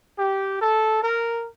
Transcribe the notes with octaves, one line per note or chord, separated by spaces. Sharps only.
G4
A4
A#4